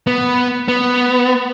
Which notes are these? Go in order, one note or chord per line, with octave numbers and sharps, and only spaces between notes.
B3
B3